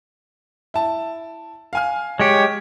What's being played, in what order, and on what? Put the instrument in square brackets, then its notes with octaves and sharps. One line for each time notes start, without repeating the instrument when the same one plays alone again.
[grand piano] E4 A5
F5 G#5 F6
[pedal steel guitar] G#3 G4 [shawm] C#5